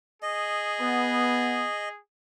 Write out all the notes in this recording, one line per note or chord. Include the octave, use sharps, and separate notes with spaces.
G#4 D#5
B3